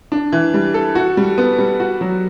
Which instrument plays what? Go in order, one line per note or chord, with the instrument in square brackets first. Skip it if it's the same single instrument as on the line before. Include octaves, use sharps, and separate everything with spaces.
[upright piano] D4
E3
G3
A4
F#4
G3
B3
G3
F#4
F#3